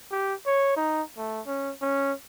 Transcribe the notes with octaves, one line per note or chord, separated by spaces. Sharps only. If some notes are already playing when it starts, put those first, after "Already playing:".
G4
C#5
D#4
A3
C#4
C#4